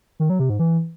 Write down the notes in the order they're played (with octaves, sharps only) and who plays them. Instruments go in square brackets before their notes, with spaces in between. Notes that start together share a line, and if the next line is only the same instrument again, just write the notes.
[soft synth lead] D#3
F#3
C3
G#2
E3